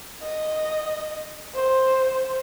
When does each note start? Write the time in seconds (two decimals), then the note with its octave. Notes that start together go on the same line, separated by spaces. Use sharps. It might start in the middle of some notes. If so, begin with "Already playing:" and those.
0.23 D#5
1.55 C5